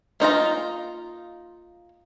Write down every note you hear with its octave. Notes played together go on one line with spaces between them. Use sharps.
A#3 D#4 F4 A#5